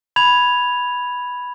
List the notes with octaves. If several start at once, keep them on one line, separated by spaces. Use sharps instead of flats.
B5 G#6 F7